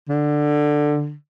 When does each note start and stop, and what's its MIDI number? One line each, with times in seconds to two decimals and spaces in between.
0.09 1.14 50